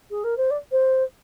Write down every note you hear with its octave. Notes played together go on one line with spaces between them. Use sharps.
G#4
A#4
C5
D5
C5